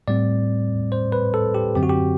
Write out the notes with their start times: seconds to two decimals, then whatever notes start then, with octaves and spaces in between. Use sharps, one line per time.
0.08 A2 G3 C4 D5
0.92 C5
1.12 B4
1.34 A4
1.55 G4
1.75 F#2 D3 F#3 C4 G4
1.83 F#4
1.90 G4